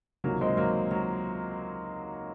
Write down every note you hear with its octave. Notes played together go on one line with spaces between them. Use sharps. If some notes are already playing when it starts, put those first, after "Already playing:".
C#2 C3 D#3 F#3 A#3
G#3 C4
F#3 A#3
F#3